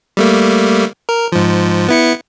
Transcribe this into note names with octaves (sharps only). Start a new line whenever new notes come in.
G3 A3 A#3
A#4
G#2 F3
B3 E4 C#7